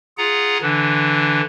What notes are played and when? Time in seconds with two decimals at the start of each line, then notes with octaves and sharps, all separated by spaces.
0.18 F4 G#4 F#5 A#5
0.62 D3 E3 D4